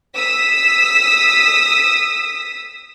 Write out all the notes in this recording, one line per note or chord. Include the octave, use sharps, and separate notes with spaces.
D#6 E6 B6